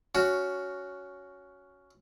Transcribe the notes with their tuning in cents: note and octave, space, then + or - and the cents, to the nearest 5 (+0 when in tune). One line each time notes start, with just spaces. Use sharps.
C#4 +10 F#4 +0